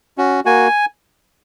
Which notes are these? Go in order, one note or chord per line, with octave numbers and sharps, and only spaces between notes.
C#4 F#4
A#3 F#4 G#5